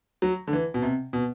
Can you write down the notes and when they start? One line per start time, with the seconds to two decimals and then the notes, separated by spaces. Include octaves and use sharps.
0.22 F#3
0.47 D3
0.53 E3
0.74 B2
0.82 C3
1.13 B2